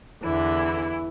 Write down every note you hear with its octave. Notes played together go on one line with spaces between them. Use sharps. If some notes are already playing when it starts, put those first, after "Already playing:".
E2 D3 E3 E4